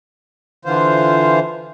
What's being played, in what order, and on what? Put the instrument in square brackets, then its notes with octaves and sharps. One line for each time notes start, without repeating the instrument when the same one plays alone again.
[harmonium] D3 E3 F4 C5